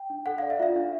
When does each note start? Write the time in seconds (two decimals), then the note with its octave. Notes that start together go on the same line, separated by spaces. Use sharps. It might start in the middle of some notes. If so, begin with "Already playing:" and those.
Already playing: G5
0.10 D4
0.26 A4 F#5
0.38 D5 F5
0.50 E5
0.59 F4 F5
0.76 D4